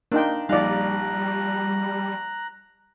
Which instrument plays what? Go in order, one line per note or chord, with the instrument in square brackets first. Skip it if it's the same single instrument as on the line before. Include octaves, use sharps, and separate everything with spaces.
[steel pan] A#3 D#4 G5 [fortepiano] D4
[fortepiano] A#1 F5 [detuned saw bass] G3 [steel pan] D#4 D5 [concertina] A#5 F#6